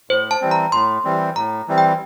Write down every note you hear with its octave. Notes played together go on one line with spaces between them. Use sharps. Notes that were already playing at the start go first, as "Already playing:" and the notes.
A2 C5
A5
E3 G3 C4
A#5
A2 C6
E3 G3 C4
A2 A#5
E3 G3 C4
G5